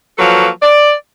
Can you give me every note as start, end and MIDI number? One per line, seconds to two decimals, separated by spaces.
0.18 0.48 53
0.18 0.48 54
0.18 0.48 58
0.18 0.48 69
0.18 0.48 71
0.18 0.48 73
0.62 0.93 74